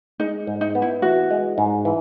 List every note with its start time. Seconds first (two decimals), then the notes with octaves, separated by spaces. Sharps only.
0.20 G#3 D#4
0.47 G#2
0.61 D#4
0.75 B3
0.82 E4
1.02 E3 F#4
1.31 G#3
1.58 G#2
1.85 E3